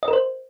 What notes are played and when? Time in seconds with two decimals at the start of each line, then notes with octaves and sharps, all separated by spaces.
0.03 D#5
0.08 A#4
0.13 C5